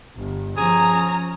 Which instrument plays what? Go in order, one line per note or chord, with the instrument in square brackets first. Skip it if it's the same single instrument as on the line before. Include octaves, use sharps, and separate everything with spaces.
[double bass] G1
[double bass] F3 C#4 [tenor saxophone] G#4 [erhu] A#5